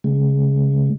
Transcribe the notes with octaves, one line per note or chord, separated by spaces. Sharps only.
C#3 G#3